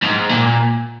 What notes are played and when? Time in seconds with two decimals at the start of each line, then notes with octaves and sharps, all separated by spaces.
0.02 G#2
0.29 A#2